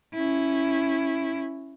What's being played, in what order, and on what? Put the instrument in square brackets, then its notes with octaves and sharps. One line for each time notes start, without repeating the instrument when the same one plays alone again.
[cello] C#4 E4